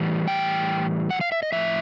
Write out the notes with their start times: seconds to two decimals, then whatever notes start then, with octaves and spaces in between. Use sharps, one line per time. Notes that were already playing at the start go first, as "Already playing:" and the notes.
Already playing: A2 E3 G3
0.28 G5
1.10 F#5
1.21 F5
1.32 E5
1.43 D#5
1.52 A2 F3 E5